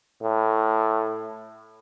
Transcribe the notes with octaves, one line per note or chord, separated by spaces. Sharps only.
A2